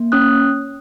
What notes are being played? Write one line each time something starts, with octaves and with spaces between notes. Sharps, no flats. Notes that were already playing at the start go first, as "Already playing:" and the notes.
Already playing: A#3
C#4 D#6 F#6